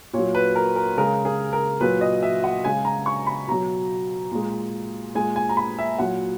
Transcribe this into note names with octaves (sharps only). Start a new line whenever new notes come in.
A#2 F#3 C#5
B4
A#4
A#4
C#3 G#3 A#4
G#4
A#4
A#2 F#3 B4
D#5
E5
F#5
C#3 G#3 G#5
A#5
C#6
B5
B2 F#3 A#5
A#2 G#3
A#2 G#3 G#5
G#5
A#5
B5
E5
A#2 F#3 F#5